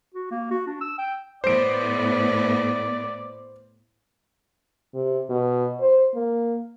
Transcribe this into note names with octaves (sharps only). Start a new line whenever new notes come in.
F#4
A#3
F#4
D4
E6
G5
A2 B3 C5 D5 D7
C3
B2
C5
A#3